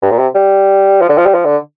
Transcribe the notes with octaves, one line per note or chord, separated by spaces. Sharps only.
G2
A#2
C3
G3
F3
D3
F3
G3
F3
D3